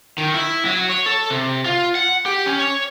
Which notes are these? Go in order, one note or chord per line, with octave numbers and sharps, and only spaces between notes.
D#3
E4
F#3
C#5
A4
C3
F4
F#5
G4
C#4
C#5